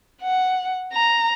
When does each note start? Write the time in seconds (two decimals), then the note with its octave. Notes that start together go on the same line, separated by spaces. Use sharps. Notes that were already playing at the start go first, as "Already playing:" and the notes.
0.22 F#5
0.93 A#5